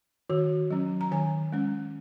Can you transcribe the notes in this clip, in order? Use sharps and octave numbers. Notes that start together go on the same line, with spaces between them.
D#3 F#4
F#3 C#4
A#5
D#3 G#5
G#3 C#4